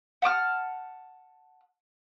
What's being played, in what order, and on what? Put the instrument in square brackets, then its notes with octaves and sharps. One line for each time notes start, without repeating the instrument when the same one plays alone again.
[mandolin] F#5 A5 D6 F6